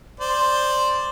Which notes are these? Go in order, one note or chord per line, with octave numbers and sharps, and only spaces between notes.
C5 D5